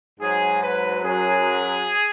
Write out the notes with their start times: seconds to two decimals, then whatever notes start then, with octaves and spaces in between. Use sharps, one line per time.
0.20 G#2 F#3 G#4
0.62 B4
1.03 F#2 F#3 G#4